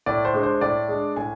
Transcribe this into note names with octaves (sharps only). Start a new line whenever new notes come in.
A2 D5
C5
G#3 D4
C5
A2 D5
G#3 D4
A2 G#5